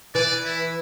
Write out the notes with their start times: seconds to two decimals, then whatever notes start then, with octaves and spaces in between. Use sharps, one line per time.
0.14 E3 D5
0.45 E4